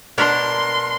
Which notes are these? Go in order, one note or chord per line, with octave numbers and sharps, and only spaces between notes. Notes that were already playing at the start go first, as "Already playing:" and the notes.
B2 D4 A#4 C6